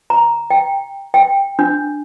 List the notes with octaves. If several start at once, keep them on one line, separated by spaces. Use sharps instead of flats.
A#5
G5
G5
D4